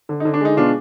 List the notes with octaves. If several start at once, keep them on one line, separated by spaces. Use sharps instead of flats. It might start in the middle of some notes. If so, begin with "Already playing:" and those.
D3
D#4
D3
D4
G#3 D#4
B2 D4 F4